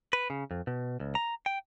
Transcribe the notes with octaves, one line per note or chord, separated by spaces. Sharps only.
B4
C#3
F2
B2
C#2
A#5
G5